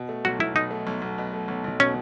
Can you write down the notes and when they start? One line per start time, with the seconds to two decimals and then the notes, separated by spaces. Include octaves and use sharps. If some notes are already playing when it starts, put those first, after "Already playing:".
Already playing: B2
0.09 A3
0.25 B1 F#4
0.40 B1 E4
0.56 B2 D#4
0.71 A3
0.87 B1
1.02 B1
1.18 B2
1.33 A3
1.48 B1
1.64 B1
1.80 B2 C#4